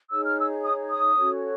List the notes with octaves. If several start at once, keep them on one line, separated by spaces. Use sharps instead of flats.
D#4 G#4 C#5 E6
F6
E6
D#6
D#6
C#4 F#4 A4 C#5